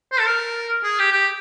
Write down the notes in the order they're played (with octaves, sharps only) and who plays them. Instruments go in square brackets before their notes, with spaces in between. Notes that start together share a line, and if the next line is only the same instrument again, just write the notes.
[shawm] C5
A4
A#4
G#4
G4
G4